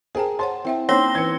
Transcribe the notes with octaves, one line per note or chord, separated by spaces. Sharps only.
G#4 A#4 C5 G5 A5
C5 C#5 F#5 A5 C6
C4 E4 E5 G5
A#3 C4 C#4 D#4 C5 C#5 A#6 G7
E3 E4 B4 G#6 C#7